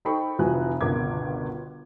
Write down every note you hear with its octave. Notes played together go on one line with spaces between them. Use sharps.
D#4 A4 C5 G5 B5 C#6
F1 E3 F3 F#4 G#5 F#6
G1 C#2 B2 A#4 D6 G#6